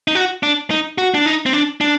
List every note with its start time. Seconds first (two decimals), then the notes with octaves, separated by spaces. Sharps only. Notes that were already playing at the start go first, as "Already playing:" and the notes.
0.08 D#4
0.15 F#4
0.43 D4
0.71 D#4
0.98 F#4
1.14 D4
1.26 D#4
1.46 C4
1.53 D4
1.81 D4